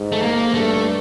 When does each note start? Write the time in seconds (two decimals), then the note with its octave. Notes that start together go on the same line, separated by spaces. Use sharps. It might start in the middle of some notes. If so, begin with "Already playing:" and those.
Already playing: G#2
0.12 A3
0.22 A#3
0.54 G2 A3